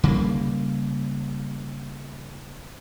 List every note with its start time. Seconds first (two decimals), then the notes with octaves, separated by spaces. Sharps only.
0.04 C#3 G3 G#3 A#3